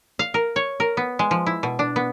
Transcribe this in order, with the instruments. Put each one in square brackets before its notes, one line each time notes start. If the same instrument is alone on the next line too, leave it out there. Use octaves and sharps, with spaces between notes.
[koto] F5
A#4
C#5
A#4
B3
G#3
F3
E4
B2
D4
B3